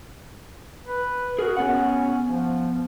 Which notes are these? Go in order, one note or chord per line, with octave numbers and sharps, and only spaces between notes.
B4
F#4 G#4 A#4
B3 C#4 F#5
F3